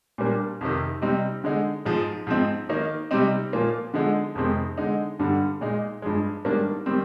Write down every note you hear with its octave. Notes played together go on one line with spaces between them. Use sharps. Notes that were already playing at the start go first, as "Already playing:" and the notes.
A#2 G3 A#3 D4
F2 C3 D#3
C3 G3 C4 D#4
D3 G#3 D#4
G#2 F3 G#3
G#2 F3 C4 D#4
D#3 A#3 D#4
C3 G3 C4 D#4
A#2 F3 A#3 F4
D3 F3 G#3 D#4
F2 C3 D#3 G#3 C4
D3 G#3 D#4
G2 D3 G3
A#2 G#3 D#4
G2 F3 G#3
G#2 D#3 G3 A#3 D4
D#3 G3 C4